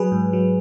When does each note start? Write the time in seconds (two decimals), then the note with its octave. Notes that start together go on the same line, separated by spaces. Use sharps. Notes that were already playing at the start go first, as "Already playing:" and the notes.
Already playing: F#3 G#4 B4
0.12 G#2
0.33 F#3